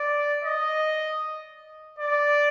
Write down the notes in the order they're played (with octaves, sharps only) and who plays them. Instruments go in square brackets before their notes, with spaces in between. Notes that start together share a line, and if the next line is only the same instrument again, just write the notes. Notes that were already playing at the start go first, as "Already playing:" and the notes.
Already playing: [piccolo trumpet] D5
D#5
D5